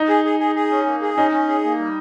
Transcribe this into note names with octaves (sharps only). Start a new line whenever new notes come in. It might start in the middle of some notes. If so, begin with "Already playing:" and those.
Already playing: D#4
G#4
G#4
G#4
G#4
C#4
A#3
G#4
C#4 D#4
C#4
G#4
A#3
G3